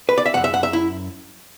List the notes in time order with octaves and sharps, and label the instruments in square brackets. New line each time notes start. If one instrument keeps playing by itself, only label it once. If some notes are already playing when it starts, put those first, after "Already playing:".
[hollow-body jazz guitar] B4
D5
E5
F#2 E3 F#5
E5
F#5
E5
E4